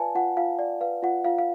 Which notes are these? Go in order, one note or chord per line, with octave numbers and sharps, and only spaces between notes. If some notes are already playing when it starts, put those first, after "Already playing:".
Already playing: F4 B4 D5 F5 G#5 A5
F4 F#5
F4 F5
D5
B4 F5
F4 F#5
F4 F5
F5